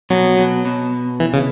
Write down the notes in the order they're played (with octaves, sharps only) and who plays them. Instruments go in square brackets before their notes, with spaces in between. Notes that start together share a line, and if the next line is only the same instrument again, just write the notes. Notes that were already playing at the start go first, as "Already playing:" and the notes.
[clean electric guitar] B2 [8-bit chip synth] F#3
[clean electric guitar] B2
B2
[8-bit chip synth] E3
C#3